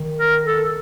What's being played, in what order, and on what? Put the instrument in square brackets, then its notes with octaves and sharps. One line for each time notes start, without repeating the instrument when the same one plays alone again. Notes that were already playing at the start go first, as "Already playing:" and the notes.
Already playing: [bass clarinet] D#3
[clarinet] A#4
A4